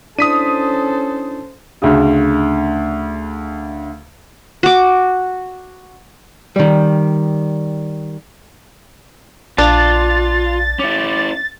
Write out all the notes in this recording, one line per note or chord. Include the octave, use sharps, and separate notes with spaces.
C#4 D4 E4 A4 C5 D#6 B6 D#7
D2 C#3
F#4 D6
D#3 G3
A#1 D4 F4 A6
C#4 E4 D6